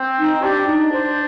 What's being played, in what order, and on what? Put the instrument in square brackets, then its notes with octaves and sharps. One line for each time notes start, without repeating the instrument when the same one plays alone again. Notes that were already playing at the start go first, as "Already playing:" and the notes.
Already playing: [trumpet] C4
[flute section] D#4
[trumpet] D4 [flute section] G4
[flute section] D#4
C5